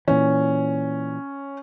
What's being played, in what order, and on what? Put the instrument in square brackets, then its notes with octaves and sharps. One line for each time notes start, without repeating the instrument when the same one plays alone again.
[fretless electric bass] A#2 E3 [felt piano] C#4